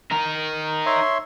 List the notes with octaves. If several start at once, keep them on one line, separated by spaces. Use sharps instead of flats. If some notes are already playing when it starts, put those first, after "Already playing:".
D#4 A#4
C#5 E5 C6